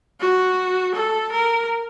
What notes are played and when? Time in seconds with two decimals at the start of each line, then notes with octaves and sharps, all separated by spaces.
0.20 F#4
0.94 A4
1.32 A#4